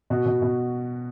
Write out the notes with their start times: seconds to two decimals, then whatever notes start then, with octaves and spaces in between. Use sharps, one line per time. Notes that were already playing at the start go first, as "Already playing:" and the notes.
0.10 B2 F#4
0.26 B2
0.42 B2